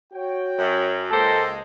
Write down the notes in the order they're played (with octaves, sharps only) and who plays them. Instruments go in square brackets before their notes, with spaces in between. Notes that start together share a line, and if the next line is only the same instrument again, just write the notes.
[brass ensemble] F#4 C#5 G5
[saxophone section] F#2
[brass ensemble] C#2 G#3 [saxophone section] A#3 G4 C5 [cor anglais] A4